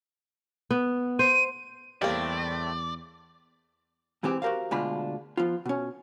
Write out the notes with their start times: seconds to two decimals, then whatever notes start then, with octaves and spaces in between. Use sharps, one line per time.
0.71 B3
1.19 C5 D#7
2.02 E2 A2 G3 A3 A#3 C4 D5
4.23 G#2 E3 G#3 C4 G4
4.42 F#4 G4 A#4 C5 F5
4.71 D2 B2 G#3 D4 F4 B5
5.37 F3 B3 F4
5.66 B2 C#4